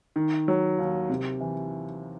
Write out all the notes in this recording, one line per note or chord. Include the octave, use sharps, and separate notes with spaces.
D#3
F#3
D#2
C3
E3